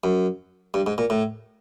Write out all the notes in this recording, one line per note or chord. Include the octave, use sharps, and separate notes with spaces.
F#2
G2
G#2
A#2
A2